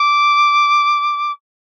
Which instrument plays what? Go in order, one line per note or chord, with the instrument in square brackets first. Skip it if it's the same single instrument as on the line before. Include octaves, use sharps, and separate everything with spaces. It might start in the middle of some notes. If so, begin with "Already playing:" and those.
Already playing: [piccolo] D6